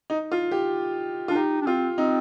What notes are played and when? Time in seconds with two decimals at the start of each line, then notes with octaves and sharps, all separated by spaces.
0.10 D#4
0.32 F4
0.51 G4
1.28 F4
1.31 D4
1.35 D#4 G4
1.62 D4
1.67 C4 F4
1.98 C4 D#4